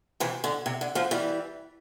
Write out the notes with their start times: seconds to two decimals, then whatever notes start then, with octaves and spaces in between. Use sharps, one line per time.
0.20 C3 E3
0.44 D3
0.66 C3
0.81 D3
0.95 D3 F3
1.11 E3 G3